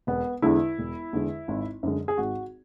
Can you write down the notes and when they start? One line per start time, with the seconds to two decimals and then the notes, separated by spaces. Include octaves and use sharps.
0.07 E1 B3
0.42 E2 D3 G#3 E4
0.78 E1
1.13 E2 D3 G#3
1.48 G#1
1.83 F#2 D3 G#3
2.08 G#4
2.17 G#1 F#4